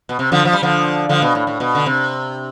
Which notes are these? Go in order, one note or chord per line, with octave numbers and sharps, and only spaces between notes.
B2
C3
D3 F3
F3
G3
D3 F3
D3 F3
B2
A2
A2
B2
D3
C3